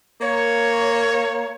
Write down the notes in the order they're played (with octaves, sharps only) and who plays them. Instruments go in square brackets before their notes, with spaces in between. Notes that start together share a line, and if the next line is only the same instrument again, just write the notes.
[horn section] A#3 C#5